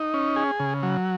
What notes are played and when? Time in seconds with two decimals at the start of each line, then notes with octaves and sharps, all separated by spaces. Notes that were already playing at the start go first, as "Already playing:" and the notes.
Already playing: D#4
0.14 C#4
0.36 G#4
0.60 C#3
0.83 F#3